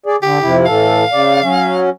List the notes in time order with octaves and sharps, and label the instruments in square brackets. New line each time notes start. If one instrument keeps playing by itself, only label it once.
[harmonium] G#4 D5
[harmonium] D3 [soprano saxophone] G4
[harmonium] F2 C3 E4
[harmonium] A2 E3 A4 [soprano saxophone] F5
[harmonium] C#3 D5
F#3 C#4